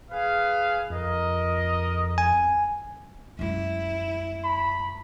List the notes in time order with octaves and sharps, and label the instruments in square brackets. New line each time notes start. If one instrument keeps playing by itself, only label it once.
[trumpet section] G#4 B4 F5
[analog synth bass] F2 [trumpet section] A#4 D#5
[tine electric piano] G#5
[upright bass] F#2 G#3 [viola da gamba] E4
[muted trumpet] B5